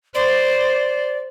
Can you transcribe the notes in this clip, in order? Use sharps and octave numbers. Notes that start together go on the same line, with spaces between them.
C5 D5